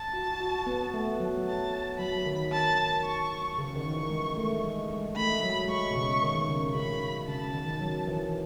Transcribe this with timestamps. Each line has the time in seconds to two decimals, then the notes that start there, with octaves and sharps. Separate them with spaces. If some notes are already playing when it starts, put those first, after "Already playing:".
Already playing: A5
0.13 F#4
0.40 F#4
0.67 B3
0.94 A3
1.20 F#3
1.46 A5
1.99 F#3 B5
2.26 D#3
2.52 A5
3.05 C#6
3.58 C#3 C#6
3.75 D#3
3.93 E3
4.10 G#3
4.37 A3
4.64 G#3
4.90 G#3
5.16 A3 B5
5.43 F#3
5.69 G#3 C#6
5.91 B2
5.96 C#3
6.22 D#3
6.49 C#3
6.75 C#3 B5
7.28 C#3 A5
7.54 D#3
7.81 F#3
8.07 E3